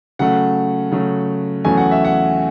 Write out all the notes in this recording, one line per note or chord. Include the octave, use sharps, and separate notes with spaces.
C#3 F#3 A3 F#5
C#3 F#3 A3
E2 C#3 F#3 A3 G#5
F#5
E5
F#5